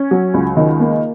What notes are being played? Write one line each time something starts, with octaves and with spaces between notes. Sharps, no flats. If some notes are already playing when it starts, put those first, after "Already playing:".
Already playing: C#4
F#3
C#2
D#3
A#3